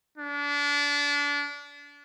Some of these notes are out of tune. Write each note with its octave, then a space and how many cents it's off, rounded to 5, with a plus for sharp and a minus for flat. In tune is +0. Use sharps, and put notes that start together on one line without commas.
D4 -30